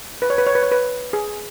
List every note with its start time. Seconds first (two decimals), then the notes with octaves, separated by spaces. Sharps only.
0.22 B4
0.30 C#5
0.38 B4
0.46 C#5
0.55 B4
0.63 C#5
0.72 B4
1.13 G#4